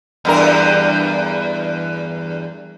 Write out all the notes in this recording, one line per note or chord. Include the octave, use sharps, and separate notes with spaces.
E2 G2 A#4